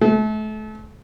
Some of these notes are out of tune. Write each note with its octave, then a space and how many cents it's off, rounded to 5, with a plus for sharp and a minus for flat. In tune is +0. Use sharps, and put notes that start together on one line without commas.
A3 -35